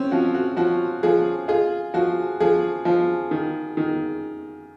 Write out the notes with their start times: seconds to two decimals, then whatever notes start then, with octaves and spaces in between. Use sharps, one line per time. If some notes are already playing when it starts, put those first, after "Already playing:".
Already playing: C4 C#4
0.11 F3 F#4
0.34 F#4
0.57 F3 F#4
1.03 F3 G#4
1.48 F4 G#4
1.94 F3 F#4
2.40 F3 G#4
2.85 F3
3.31 D#3
3.77 D#3